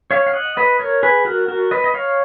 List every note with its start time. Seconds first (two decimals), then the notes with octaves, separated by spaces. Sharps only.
0.11 C#5 F5
0.26 F5
0.34 D#5 F#5
0.57 B4 D#5
0.79 A#4 C#5
1.03 G#4 B4
1.25 F#4 A#4
1.48 F#4 A#4
1.71 B4 D#5
1.84 D#5
1.94 C#5 F5